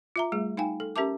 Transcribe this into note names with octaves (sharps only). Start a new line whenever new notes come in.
F4 E5 A#5
G3 A3 G#4
D#4 F5 G5 G#5
A4
C#4 G4 A#4 E5 A5 D6